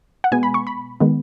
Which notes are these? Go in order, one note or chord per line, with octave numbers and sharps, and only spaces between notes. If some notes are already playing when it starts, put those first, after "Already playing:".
F#5
B2 G#3 B3 G#5
B5
C#6
B5
D#3 G#3 B3